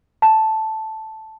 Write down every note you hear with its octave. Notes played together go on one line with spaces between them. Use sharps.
A5